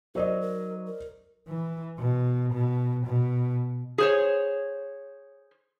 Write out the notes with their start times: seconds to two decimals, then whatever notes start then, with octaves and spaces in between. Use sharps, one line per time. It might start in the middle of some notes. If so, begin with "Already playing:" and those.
0.15 F#3 D#4 A#4 C5 D5 D#5
0.41 A#4
0.87 A#4
1.49 E3
1.99 B2
2.53 B2
3.06 B2
3.98 G#4 C5 C#5